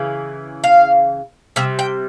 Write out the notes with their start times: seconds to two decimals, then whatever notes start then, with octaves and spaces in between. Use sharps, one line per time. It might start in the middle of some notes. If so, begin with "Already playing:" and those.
Already playing: C#3 E3
0.64 F5
1.56 C3 G3 E5
1.79 G5